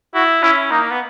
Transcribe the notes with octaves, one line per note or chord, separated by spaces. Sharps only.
E4 F#4
C#4 E4
A#3 D#4
B3